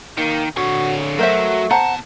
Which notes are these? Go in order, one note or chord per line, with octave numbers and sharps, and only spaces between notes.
D#3 A#3
D3 F#4 C#5
F#3 A3 A#4 C5 E5
B2 C5 F#5 A5 A#5